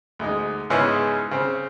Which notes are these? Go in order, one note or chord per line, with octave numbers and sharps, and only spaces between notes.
D2 G#3 D#4
G#2 C#3 G#3 B3 C#4 E4
C#3 C4